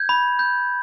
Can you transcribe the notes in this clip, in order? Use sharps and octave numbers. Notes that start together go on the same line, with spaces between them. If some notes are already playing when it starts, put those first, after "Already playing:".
Already playing: G6 G#6
B5
G6